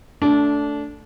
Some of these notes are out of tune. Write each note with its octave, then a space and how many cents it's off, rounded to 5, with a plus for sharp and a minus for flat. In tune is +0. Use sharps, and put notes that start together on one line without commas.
A3 +0 D4 -20